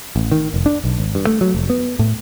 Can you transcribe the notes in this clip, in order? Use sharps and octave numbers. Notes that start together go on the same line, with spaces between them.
A1
D#3
F1
D4
B1
G#1
G2
A3
F#3
F1
B3
A2